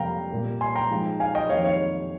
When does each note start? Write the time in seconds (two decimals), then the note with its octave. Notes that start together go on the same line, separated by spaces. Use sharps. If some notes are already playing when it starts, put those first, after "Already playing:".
Already playing: F2 C3 G3 A#3 F5 G5 A#5
0.31 A#2 G3 A#3
0.61 G#5 C6
0.75 G5 A#5
0.90 G#2 F3 G#3
1.20 F5 G#5
1.35 D#5 G5
1.49 F2 D#3 A#3 C#5 F5
1.64 C#5 F5